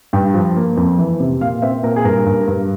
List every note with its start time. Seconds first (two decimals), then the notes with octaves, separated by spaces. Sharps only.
0.13 G2 G5
0.34 F3
0.56 A#3
0.77 F2
0.99 E3
1.20 C3
1.41 A#2 F5
1.62 C4 E5
1.83 A#2 A#4
1.96 G#4
2.04 G2 A#4
2.26 G2
2.48 G2